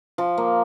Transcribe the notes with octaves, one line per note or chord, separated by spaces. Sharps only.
F3
A#3